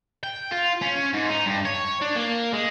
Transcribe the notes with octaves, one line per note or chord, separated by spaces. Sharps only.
G5
F4
C#4
G#2
D#4
G2
C#5
D4
A#3
G#3